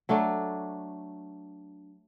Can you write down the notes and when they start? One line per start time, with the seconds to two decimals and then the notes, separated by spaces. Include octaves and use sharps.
0.09 F#3 A3 D4